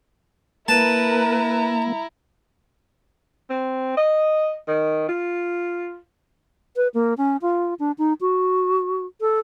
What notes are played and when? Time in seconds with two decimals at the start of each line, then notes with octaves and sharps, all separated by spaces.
0.68 A#3 E4 A#4 B4 A5 A#5
3.50 C4
3.97 D#5
4.68 D#3
5.09 F4
6.76 B4
6.94 A#3
7.17 C#4
7.42 F4
7.79 D4
7.98 D#4
8.21 F#4
9.21 A4